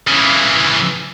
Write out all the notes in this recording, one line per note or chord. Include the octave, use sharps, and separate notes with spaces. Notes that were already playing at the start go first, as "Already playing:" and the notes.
C#3 E3